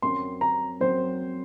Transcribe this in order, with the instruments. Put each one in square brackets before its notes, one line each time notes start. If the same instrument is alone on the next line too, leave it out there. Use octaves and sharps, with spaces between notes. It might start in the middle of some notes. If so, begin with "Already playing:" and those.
[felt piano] F#2 F#3 C4 [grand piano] C6
[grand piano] A#5
[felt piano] F#2 F#3 C4 [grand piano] C5